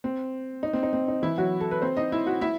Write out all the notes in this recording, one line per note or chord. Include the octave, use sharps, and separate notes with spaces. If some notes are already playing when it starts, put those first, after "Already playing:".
C4
D#4
C4
D#4
C4
D#4
E3 E4
F#3 F#4
A4
B4
C4 C5
D#4 D#5
E4 E5
F#4 F#5
E4 E5